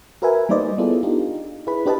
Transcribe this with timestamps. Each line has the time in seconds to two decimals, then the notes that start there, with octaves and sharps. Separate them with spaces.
0.22 F#4 A#4 B4 E5 G#5
0.49 G3 A#3 D#4 C5 D5 D#5
0.78 B3 E4 F4 G#4 A4
1.03 D4 D#4 F4 G4
1.67 E4 G#4 B4 B5
1.86 D4 G4 B4 D#5 A5